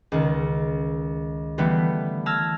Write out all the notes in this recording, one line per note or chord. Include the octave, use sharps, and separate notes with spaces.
C#2 D#3
D3 E3 G3 A3 B3
A5 E6 F6 G#6 A#6